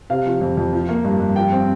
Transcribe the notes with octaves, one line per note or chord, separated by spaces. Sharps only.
C3 F5
F3
F2
F2
F3
A#3
G2
G2
F3 G5
C4